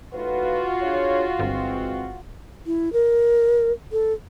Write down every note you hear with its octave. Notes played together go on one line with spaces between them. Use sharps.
A2 D#4 F4 F#4 B4
D4 G#4 C#5
G1 E3 G#3 C4
E4
A#4
A4